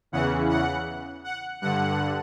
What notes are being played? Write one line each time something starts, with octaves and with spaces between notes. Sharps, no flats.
E2 C#3 E3 F#5
F#5
F#5
G2 D3 F#5